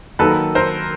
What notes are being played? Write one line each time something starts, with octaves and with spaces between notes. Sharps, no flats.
D#3 F#3 A#3 A4 B4
A#4 C5